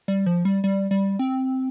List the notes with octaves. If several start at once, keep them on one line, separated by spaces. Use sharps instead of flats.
G3
F3
G3
G3
G3
C4